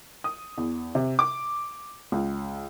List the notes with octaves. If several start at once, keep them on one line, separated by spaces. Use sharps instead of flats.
D#6
E2
C3
D6
C#2